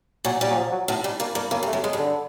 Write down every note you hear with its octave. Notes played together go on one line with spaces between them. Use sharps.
A#2 F#3
A#2 G3
F#3
F3
F#3
A2 F#3
G#2 G3
G2 A#3
G2 A#3
F#2 A#3
G2
A3
F#2
F#2 G#3
G2
D3